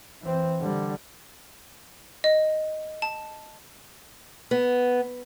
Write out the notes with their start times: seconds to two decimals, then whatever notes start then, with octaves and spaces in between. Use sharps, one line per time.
0.22 E3 C4
0.61 D3 G3
2.24 D#5
3.02 A5
4.51 B3